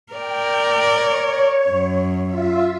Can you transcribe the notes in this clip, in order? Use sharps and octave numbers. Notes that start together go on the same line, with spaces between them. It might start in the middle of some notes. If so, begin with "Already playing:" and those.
A#4 D5 G5
C#5
F#2
F4 E5